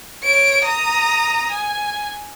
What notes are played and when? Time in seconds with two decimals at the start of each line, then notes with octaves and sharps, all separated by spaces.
0.24 C#5 D7
0.65 A#5 D#6
1.52 G#5